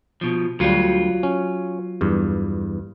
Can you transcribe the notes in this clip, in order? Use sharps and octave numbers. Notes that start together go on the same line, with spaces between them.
B2 F3
D2 F#3 G3 F4
C#4
E2 G2